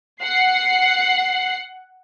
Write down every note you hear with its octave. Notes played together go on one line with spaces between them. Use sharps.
F#5 C7